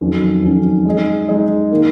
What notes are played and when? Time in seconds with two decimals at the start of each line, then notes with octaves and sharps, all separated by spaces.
0.01 F2 D#3 F#3 C#4
0.43 F2 D#3 F#3 C#4
0.85 G#3 D#4 G#4 D#5
1.28 G#3 D#4 G#4 D#5
1.71 D#3 A#3